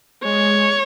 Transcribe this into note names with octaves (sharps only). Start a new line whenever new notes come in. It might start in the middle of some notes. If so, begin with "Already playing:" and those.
G#3 C#5